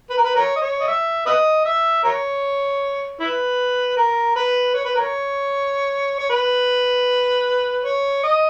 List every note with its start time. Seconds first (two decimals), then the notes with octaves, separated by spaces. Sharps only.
0.10 B4
0.17 A#4
0.24 B4
0.35 A#4 C#5
0.56 D#5
0.62 C#5
0.80 D#5
0.87 E5
1.26 B4 D#5
1.65 E5
2.04 A#4 C#5
3.20 E4 B4
3.97 A#4
4.36 B4
4.75 C#5
4.85 B4
4.96 A#4 C#5
6.19 C#5
6.30 B4
7.85 C#5
8.24 D#5